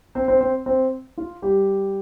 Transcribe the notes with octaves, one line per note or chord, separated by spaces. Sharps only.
C4 C5
C4 C5
C4 C5
C4 C5
F4
G3 G4